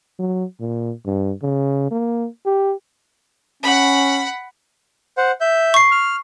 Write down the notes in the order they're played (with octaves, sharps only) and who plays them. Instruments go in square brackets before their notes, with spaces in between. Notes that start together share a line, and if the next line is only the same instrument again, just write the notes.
[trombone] F#3
A#2
G2
C#3
A#3
G4
[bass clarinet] C#4 [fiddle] F#5 B5
[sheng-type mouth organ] C5 F#5
E5 G6
[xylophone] C#6 C7
[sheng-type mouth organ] F6